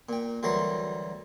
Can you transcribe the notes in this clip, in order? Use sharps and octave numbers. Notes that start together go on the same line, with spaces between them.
A#2 G5
D2 E3 F#3 G3 A#4 C6